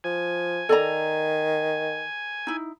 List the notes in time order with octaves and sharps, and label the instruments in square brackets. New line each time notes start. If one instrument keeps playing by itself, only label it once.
[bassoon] F3 [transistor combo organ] G#5
[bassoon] D#3 [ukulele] A4 D5 A#5
[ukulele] D#4 E4